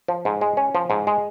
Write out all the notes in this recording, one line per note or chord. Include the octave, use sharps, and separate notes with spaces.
F3
G#2
G#3
C#4
F3
G#2
G#3